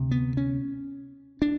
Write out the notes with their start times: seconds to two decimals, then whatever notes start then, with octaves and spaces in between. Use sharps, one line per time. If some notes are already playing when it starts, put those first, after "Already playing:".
Already playing: D2 C3
0.11 B3
0.37 C#4
1.42 D4